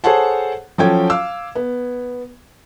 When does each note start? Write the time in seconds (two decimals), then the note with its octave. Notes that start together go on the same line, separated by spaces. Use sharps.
0.04 G#4 A4 C5 C#5 F#5 A5
0.78 F3 F#3 C#4 A4 G5 G#6
1.10 F5 D6 E6
1.55 B3